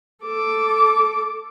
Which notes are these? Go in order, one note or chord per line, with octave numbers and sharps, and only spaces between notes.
A4 D6